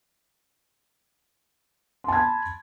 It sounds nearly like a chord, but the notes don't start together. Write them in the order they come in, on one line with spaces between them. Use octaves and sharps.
C6 A5 G#6 B5